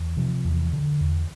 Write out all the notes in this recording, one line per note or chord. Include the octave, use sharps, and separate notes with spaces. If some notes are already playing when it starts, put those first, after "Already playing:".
Already playing: E2
C3 F3
E2
D3
E2